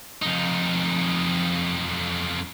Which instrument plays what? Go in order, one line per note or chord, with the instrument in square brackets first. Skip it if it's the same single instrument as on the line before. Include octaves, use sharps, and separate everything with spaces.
[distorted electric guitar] F2 D#4